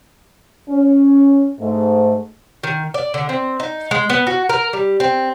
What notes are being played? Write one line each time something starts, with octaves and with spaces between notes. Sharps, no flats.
C#4
G#2 A3
D#3
D5
D3
C4
D#4
G#3
B3
F#4
A#4
G3
C4